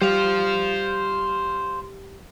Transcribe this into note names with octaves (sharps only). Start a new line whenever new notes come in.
G3 C5 F5